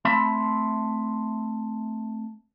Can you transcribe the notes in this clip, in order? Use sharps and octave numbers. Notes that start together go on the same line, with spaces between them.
A3 C4 E5 A5 B5 C6